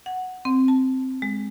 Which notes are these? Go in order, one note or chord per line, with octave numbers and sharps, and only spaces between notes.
F#5
C4
A5
G#3